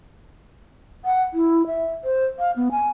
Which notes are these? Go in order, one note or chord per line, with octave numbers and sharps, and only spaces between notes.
F#5
E4
E5
C5
F5
B3
G#5